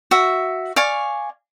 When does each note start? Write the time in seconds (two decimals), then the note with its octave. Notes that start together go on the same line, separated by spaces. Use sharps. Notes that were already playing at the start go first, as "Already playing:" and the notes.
0.11 F#4 E5
0.76 D5 F5 G#5 C#6